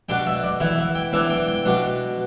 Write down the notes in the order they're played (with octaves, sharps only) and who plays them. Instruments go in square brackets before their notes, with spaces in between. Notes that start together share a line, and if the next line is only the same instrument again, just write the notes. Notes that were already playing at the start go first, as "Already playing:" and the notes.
[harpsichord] B2 B3 D4 G5
E5
D5
E3 B3 E4 E5
E5
G5
E3 B3 D4 E5
G5
G5
B2 B3 D4